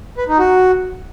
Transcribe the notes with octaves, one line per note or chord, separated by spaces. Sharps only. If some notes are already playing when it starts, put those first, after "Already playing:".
B4
D#4
F#4